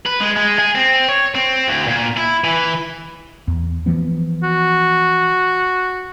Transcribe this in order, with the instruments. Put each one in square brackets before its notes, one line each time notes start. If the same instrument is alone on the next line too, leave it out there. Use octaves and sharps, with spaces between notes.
[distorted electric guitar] B4
G#3
G#3
G#4
C4
C#5
C4
D2
A#2
E4
E3
[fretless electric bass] E2
E3 F3 B3
[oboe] F#4